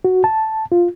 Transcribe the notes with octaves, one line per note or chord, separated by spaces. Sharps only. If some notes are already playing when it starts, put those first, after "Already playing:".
F#4
A5
F4